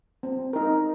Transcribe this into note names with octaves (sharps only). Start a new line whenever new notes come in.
C4
D#4 A#4